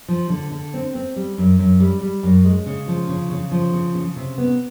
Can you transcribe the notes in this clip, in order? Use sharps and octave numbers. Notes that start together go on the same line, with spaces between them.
F3
D3
D3
C4
C4
G3
F#2
F#2
G3
G3
F#2
G#3
C#3
F3
C#3
C#3
F3
C#3
C#3
C3
B3